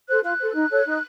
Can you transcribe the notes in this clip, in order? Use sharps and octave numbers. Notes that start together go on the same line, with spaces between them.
A4 C5 F#6
F4 F#6
A4 C5
D#4
A4 C#5
D#4